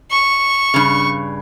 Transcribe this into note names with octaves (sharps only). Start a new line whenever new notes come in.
C#6
G2 C#3